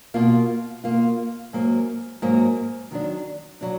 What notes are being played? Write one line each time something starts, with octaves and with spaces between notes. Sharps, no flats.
B2 A#3 F4
B2 A#3 F4
G#2 F#3 A#3
G#2 F#3 A#3
D#3 F#3 D4
F#3 D4